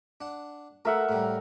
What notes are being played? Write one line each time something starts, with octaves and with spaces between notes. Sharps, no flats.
D4 F#5
A3 A#4 E5 F#5
A2 G3